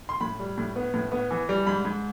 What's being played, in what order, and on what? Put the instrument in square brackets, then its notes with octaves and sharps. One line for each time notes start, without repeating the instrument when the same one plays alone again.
[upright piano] C6
A2 B5
G3
A2
B3
A2
B3
E3
G3
G#2 B5
G#2